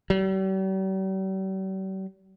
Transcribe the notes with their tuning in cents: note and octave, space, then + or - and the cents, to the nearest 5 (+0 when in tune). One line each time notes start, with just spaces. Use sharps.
G3 -45